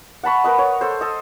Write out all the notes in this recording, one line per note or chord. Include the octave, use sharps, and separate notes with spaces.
F#5 A5 B5 C#6
A#4 B4 D#5
C#5
A4 C5
A4 D#5